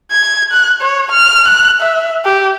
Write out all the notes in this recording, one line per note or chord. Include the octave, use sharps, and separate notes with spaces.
G#6
F#6
C#5
F6
F#6
E5
G4